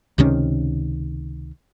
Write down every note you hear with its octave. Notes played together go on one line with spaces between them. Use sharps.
C#2 C3 D#3 C#4